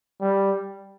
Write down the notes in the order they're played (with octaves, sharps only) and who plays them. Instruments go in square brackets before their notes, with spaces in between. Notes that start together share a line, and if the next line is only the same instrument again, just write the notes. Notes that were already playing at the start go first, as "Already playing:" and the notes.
[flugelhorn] G3